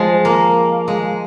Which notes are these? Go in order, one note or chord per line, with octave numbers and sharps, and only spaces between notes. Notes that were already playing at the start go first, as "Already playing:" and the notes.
Already playing: F3 G#3
A#3
G#3